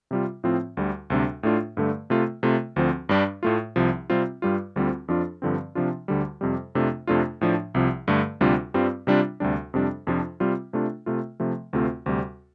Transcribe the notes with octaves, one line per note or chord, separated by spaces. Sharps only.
C3 G3 F4
A2 F3 C4 F4
D2 D3 G3
D2 C3 G3 D4
A2 A3 D4 F4
G2 D3 A3
C3 A3 F4
C3 A3 F4
D2 D3 F3 C4
G2 G3 D4
A2 A3 F4
C2 C3 F3
C3 G3 C4 F4
G2 G3 F4
D2 D3 G3 C4 F4
F2 F3 D4 F4
G2 D3 F3 C4
C3 F3 D4 F4
D2 D3 G3
F2 C3 G3
F2 C3 A3 D4 F4
F2 C3 A3 D4 F4
A2 F3 D4
C2 C3 F3
G2 D3 A3
D2 C3 G3 D4 F4
G2 G3 C4 F4
C3 G3 D4 F4
D2 C3 G3 D4
F2 C3 G3 D4
F2 C3 F3 D4 F4
C3 G3 C4 F4
C3 A3 D4 F4
C3 A3 F4
C3 F3 A3
D2 C3 A3 C4 F4
D2 C3 G3